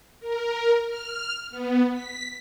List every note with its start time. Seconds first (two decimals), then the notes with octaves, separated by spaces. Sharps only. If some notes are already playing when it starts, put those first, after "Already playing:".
0.20 A#4
0.86 F6
1.51 B3
1.92 B6